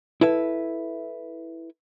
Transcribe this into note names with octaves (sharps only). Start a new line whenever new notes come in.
E4 A4 B4 E5